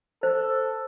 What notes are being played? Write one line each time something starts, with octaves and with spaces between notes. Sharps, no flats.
A4 C5